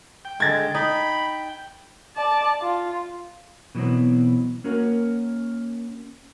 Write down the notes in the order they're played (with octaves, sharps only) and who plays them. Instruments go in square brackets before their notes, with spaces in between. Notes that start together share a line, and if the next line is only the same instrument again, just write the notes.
[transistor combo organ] G5
[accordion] D3 G#3 [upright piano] G#6 A6
[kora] D#4 [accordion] B5
[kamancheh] D5 A5
F4
[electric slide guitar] B2 E3 F#3 B3 C4
A#3 C#4 F#4 A#4